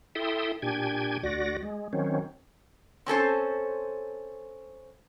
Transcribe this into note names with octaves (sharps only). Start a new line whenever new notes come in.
E4 A4 E5 G5 C6 D#6
A#2 D4 G4 G5 G#5 G#6
D2 F#4 D5 A#6
G#3
D#3 F#3 C4 C#4
C4 C#4 A4 C5